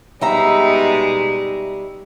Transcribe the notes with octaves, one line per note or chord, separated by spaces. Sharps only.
B2 G3 G#3 D#4 E5 A#5